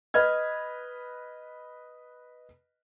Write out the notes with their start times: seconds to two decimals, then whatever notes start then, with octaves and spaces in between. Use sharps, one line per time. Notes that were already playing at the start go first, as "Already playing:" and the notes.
0.14 B4 D#5 F6 G#6